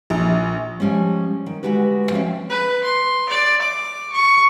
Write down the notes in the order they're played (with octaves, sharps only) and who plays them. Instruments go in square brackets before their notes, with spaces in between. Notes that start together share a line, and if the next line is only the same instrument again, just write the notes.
[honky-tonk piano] A#1
[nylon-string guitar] F3 G3 G#3 C#4
D#3
D2 G#3 F#4 G4 B4
F3 C4 C#4 E5
[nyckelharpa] B4
C6
D5
D6
C#6